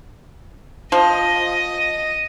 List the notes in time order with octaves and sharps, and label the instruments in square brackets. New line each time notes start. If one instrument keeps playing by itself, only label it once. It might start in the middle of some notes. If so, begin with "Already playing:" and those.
[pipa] F3 [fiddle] D#5